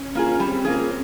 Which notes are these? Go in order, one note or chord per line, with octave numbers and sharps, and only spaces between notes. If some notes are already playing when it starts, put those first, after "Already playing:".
Already playing: C#4
A#3 F4 G#4
G3 C4
A#3 F4 G#4